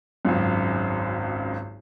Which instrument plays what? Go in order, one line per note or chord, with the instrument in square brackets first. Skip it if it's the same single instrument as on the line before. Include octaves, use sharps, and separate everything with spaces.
[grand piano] G#1 C#2 F#2